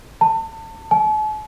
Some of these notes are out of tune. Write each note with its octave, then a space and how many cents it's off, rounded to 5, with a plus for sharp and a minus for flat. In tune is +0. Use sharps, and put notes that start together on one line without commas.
A5 +30
A5 -45